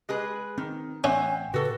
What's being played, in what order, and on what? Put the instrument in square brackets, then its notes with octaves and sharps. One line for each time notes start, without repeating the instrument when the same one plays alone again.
[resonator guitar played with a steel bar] G#3 G#4 B4
[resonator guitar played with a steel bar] D#3 [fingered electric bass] C4
[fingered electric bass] A1 [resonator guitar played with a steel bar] C4 E5 F#5 [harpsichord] C#4 [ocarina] G#5
[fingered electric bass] A2 C#3 [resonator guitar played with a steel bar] F#4 A4 [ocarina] B4